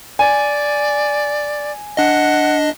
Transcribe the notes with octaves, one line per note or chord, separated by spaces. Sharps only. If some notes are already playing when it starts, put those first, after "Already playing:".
D5 G#5
D4 D#5 F#5